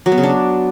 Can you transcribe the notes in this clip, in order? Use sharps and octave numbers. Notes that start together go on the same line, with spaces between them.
F#3
B3
C#3
D4